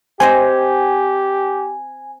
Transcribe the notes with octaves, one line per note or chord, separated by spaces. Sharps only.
C4 G4 C5 D#5 G#5